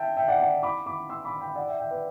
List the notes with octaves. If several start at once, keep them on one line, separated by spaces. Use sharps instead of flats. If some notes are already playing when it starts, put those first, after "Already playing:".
Already playing: E5 G5 A5
E5 G5
D5 F#5
D5 F#5
B5 D6
B5 D6
C6 E6
B5 D6
G5 B5
D5 F#5
E5 G5
E5 G5
B4 D5